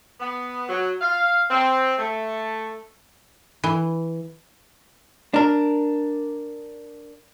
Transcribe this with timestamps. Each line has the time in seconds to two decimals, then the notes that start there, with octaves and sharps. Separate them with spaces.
0.20 B3
0.69 F#3
1.01 F5
1.49 C4
1.99 A3
3.64 E3
5.34 D4 A#4